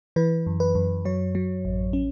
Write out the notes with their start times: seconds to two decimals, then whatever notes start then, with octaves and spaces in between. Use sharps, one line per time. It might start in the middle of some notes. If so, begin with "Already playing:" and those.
0.16 E3 B4
0.47 F#2
0.60 B4
0.75 F#2
1.05 F#3 C#5
1.35 F#3
1.65 A1
1.93 C#4